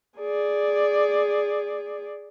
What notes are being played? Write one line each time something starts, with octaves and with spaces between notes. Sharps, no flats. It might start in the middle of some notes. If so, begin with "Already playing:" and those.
G#4 D5